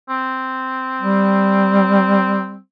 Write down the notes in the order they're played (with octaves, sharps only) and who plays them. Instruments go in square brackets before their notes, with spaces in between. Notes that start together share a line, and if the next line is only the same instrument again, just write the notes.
[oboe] C4
[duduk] G3